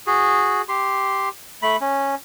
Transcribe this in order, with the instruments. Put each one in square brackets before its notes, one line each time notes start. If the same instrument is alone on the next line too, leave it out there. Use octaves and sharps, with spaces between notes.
[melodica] F#4 G#4
G4 C6
A3 B5
C#4